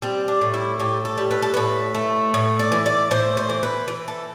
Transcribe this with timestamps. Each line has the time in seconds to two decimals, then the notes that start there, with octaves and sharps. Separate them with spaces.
0.02 G3 C4
0.28 D4
0.41 A2
0.54 E4
0.79 A2 G4
1.05 A4
1.18 G3
1.31 B4
1.42 A4
1.54 A2 B4
1.95 A3
2.34 A2
2.59 D5
2.72 E3
2.86 D5
3.11 A2 C5
3.37 C5
3.49 E3
3.63 B4
3.88 E3
4.08 A4